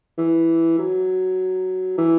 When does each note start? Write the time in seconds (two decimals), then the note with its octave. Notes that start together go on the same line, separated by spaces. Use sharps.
0.18 E3
0.78 F#3
1.98 E3